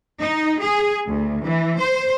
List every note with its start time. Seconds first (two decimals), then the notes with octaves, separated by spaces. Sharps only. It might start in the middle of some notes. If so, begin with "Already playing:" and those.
0.20 D#4
0.62 G#4
1.07 D2
1.45 E3
1.79 C5